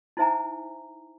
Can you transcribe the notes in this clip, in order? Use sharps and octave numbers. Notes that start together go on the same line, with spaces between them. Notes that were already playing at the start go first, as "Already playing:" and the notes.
D#4 E4 C5 E5 G#5 A#5